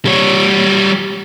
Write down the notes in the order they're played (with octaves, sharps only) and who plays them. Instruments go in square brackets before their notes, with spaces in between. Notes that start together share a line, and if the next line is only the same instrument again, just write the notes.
[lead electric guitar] G3 C#5